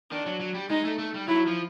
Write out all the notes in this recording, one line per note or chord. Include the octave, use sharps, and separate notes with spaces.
D#3 D4
F#3
F#3
G3
G#3 D#4
A3
A3
G3
F#3 E4
F3